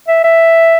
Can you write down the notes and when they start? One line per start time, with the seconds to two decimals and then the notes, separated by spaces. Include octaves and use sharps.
0.08 E5
0.24 E5